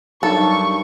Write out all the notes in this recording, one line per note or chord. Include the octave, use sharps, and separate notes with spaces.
G2 F#3 D#4 A4 A#4 C#6